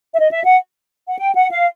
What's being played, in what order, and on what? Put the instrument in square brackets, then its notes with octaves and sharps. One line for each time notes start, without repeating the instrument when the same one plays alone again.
[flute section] E5
D#5
E5
F#5
F#5
G5
F#5
F5